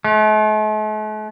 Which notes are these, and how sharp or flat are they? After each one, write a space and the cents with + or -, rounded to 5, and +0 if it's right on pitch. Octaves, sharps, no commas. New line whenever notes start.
A3 -45